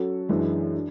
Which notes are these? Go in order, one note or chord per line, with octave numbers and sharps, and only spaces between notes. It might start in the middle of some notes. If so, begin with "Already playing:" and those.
Already playing: F#3 C#4 F#4 A4
F#2 E3 G#3 D4
D4